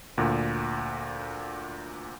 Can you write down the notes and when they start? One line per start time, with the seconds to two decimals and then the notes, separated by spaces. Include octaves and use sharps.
0.18 D2 A#2